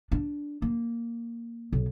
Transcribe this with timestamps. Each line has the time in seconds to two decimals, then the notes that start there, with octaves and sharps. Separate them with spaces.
0.12 D4
0.62 A#3
1.73 B1